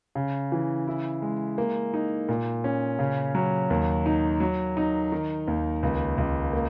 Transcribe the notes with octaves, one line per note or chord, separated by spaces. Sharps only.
C#3
E3
E4
G#3
A#3
D#4
A#2
C#4
C#3
F#3
D#2
D#4
F#3
D#4
D#3
D#2
C#2
C#2
A#3